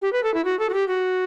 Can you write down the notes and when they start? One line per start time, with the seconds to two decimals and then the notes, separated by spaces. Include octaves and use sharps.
0.02 G4
0.13 B4
0.24 A4
0.34 E4
0.45 F#4
0.59 A4
0.69 F#4
0.74 G4
0.88 F#4